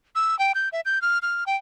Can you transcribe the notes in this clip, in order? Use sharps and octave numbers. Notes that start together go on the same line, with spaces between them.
E6
G5
G6
E5
G6
F6
F6
G5